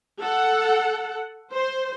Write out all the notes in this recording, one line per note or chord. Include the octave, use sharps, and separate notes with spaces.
A4 F#5
C5